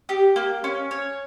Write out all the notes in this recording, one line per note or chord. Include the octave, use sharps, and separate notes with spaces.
G4
A#3
C#4
C#5